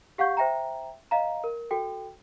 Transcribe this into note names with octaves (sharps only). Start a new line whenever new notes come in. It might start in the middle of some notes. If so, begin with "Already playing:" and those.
G4 F5 F#5 C#6 G6
C5 E5 G5 A#5
D#5 F5 A#5
A#4
F#4 A4 G5